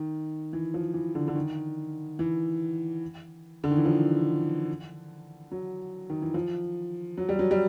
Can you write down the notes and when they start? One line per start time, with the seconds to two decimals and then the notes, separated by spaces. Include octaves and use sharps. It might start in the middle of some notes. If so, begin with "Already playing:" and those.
Already playing: D#3
0.53 E3
0.74 F3
0.94 E3
1.15 D3
1.28 D3
1.35 D#3
2.19 E3
3.64 D3
3.71 D#3
3.77 E3
3.85 F3
5.52 F#3
6.10 D#3
6.22 E3
6.34 F3
7.17 F#3
7.29 G3
7.39 F#3
7.51 G3